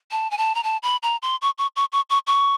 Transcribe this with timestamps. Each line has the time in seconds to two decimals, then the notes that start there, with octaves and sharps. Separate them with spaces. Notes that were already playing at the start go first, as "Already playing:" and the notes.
0.11 A5
0.31 G#5
0.38 A5
0.55 A#5
0.63 A5
0.83 B5
1.03 A#5
1.22 C6
1.42 C#6
1.58 C#6
1.76 C#6
1.92 C#6
2.10 C#6
2.27 C#6